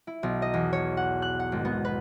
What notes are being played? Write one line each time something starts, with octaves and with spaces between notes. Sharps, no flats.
E4
B1
D#5
E2
C#5
F#5
F#6
F#5
G#1
B3
B4